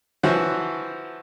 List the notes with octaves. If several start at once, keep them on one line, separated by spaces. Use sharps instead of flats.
E3 F3 E4 F#4 C5 C#5